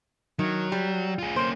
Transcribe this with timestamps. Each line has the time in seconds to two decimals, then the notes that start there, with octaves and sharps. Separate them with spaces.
0.39 D#3 F#3
0.72 G3
1.18 F4 G#4
1.36 A#3 C#4 C5